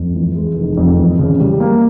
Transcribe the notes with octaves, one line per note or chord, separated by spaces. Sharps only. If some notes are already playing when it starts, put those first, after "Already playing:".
Already playing: F2
E3
G#3
F1
F2
E3
C#3
G3
A#3